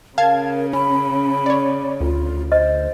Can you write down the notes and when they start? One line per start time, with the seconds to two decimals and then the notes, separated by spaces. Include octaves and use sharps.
0.18 C#3 A#4 F5 A5 G#6
0.73 C#4 B5
1.46 C#5 D5
2.01 D2 F4
2.52 C5 D#5